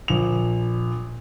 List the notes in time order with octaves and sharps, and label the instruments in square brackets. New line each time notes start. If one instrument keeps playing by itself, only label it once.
[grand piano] A#1 F7